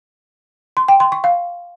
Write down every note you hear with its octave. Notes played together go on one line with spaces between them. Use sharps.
C6
G5
C6
C#6
F5